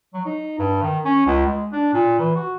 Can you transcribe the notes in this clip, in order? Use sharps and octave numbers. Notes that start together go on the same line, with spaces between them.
F#3
D#4
G2
D#3
C#4
C#2
G#3
D4
A#2
E3
F#4